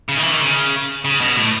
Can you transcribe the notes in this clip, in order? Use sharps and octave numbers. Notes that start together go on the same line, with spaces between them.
C#3
D#3
E3
D#3
C#3
C#3
B2
A2